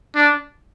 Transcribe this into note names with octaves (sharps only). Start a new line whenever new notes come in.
D4